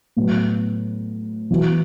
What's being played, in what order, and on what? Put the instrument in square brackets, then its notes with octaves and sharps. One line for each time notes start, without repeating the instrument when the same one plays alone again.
[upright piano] A2 F#3 B3
E3 B3 F#4